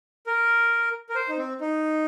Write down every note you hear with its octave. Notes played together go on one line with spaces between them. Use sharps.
A#4
A#4
C5
D#4
C4
D#4